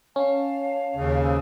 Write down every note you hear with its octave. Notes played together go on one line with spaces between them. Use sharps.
C#4 C#5 F5 A5
D#2 C#3
C5 G#5 E6